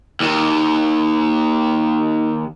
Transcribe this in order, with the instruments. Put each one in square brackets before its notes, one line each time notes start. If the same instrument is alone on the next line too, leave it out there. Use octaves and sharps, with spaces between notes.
[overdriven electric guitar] D#2 D#3